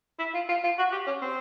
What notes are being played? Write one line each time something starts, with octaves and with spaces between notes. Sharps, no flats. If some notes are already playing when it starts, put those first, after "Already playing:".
E4
F4
F4
F4
F#4
G4
C#4
C4